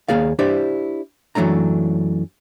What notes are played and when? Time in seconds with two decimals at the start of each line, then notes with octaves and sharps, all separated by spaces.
0.08 D#2 A#3 G#4 D5 F5
0.39 D4 E4 G4 C5 D5
1.35 F#2 E3 F#3 A3 D4 A#5